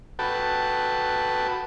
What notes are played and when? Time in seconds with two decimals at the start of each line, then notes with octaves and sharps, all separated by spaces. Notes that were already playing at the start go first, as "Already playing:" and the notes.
0.19 F#4 A4 B4 G5 A5